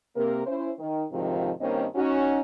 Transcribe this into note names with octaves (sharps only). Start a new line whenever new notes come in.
C3 A#3 A#4
C#4 E4 C5
D#3
D2 G#2 C3 D#3 F3
G2 D#3 A#3 C4 C#4 D#5
C#4 D#4 F#4